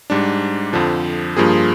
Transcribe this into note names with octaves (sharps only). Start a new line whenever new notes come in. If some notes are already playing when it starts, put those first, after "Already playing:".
G#2 G3 D4
F2 D3 F3
G2 F3 A#3 F4 G#4